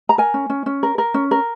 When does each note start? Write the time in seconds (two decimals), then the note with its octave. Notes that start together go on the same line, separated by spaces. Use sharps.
0.09 A#5
0.18 A#4 G#5
0.34 C#4
0.50 C#4
0.66 C#4
0.83 A#4
0.98 A#4
1.14 C#4
1.31 A#4